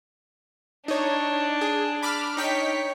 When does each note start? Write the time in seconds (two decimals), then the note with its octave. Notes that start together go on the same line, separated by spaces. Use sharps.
0.88 D4 D#4 C#5
1.61 G#4
2.03 B5 D6 F6
2.37 D#4 C#5 G5 B6